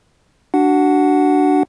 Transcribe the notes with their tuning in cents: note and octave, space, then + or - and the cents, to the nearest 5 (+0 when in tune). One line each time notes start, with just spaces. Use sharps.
D4 +0 F#4 +20 F#5 +0